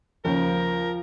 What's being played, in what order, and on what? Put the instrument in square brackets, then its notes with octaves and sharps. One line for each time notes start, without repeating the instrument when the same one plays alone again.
[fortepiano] D#2 C#3 [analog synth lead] F3 [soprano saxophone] A#4